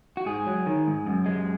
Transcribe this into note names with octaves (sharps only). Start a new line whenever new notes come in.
F#4
G#2 G#4
F#3
D#3
G#2
F#2
G#3